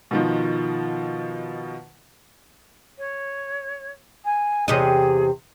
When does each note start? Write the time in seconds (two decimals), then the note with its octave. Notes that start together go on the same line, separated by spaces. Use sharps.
0.11 B2 D#3 F3
2.98 C#5
4.25 G#5
4.68 E2 C3 G#4 D#5